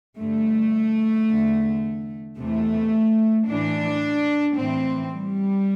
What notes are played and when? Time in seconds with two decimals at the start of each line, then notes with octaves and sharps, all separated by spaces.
0.18 G2 D3 A3
1.28 E2 D3
2.37 E2 C3 E3 A3
3.48 A2 E3 D4
4.57 A2 E3 C4
5.12 G3